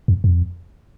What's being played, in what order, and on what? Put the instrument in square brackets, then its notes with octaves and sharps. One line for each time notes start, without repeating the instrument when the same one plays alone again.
[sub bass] F2
F2